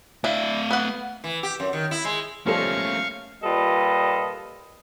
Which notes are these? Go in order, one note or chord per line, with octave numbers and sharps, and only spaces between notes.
A3 D4 E4 F5
B3 F#5
E3
G4
F#2
D#3
E4
G#3
F3 G3 A3 A#3 C#4 A4 F5 C#6
A#2 G3 F4 A4 B4 D#5